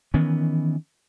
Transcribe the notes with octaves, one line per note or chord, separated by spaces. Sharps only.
D#3 E3 B3 C#4